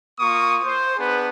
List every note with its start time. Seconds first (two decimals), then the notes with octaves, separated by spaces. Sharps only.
0.19 A#3 F4 C#6 D#6
0.64 C5
0.97 B3 D4 G#4 B4